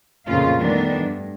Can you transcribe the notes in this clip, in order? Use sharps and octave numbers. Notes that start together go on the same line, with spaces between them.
F2 A#2 C#3 C#4 F4 F5
D#3 G3 A3 B3 D4
G2